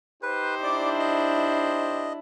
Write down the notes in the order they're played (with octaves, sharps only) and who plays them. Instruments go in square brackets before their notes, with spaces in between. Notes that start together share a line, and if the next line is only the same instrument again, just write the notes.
[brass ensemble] D#4 G4 C5 [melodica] B4
[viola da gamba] D4 [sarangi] E4 [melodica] D5 D6
[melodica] D#5